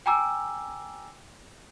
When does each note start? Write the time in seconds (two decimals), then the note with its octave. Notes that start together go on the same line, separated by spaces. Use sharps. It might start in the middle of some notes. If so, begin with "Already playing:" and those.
0.06 G5 G#5 A#5 D6 E6